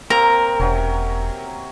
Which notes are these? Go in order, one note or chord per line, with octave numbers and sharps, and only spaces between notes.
A#3 C4 A#4 A#5
E1 C3 F#3 C#4